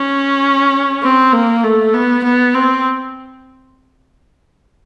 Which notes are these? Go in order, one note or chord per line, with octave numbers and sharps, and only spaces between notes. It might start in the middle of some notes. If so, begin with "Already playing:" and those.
Already playing: C#4
C4
A#3
A3
B3
B3
C4